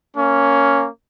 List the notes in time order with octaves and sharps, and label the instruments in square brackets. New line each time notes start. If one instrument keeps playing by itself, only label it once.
[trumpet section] A#3 C#4